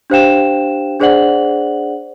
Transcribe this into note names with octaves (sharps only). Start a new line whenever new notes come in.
D4 G4 C5 F5 G5 E7
D4 G#4 C5 D5 F#5 F#7